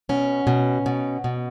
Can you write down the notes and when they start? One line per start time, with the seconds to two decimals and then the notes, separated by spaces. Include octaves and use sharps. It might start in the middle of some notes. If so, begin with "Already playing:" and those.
0.09 B2 C#4
0.47 B2
0.86 B2
1.24 B2